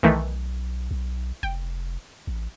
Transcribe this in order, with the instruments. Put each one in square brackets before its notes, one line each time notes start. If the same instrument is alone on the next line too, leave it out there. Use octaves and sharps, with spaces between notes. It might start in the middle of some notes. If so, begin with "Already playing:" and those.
[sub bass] B1 [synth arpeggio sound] D#3 E3 A3
[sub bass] B1
[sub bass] F1 [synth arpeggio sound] G5
[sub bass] A1